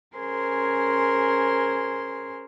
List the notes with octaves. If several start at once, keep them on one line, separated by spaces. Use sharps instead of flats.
C#4 G#4 A#4 C5 C6